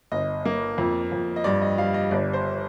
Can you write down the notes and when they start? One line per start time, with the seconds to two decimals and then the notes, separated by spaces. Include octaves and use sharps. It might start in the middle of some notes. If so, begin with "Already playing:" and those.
0.12 G1 D#5
0.45 A#3
0.78 F2
1.12 F2
1.36 D#5
1.44 G2 D5
1.62 D#5
1.78 G3 F5
1.94 D#5
2.11 G1 D5
2.33 C5